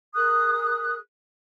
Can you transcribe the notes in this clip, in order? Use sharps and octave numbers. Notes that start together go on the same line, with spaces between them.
G#4 A#4 D#6 F#6